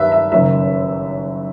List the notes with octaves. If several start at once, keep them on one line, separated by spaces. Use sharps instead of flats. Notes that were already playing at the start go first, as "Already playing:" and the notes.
Already playing: G2 D#3 F#3 B4 E5
E5
F#1 F#2 D#3 E5